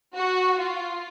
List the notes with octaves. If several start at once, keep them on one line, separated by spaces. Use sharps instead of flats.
F#4
F4